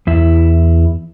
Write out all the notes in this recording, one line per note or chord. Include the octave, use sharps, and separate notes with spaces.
E2 E4